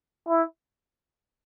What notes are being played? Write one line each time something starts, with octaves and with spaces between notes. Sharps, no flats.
E4